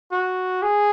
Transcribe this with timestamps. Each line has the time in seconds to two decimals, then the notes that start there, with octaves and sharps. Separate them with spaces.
0.12 F#4
0.62 G#4